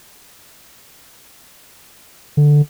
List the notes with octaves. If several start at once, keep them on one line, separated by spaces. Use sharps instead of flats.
D3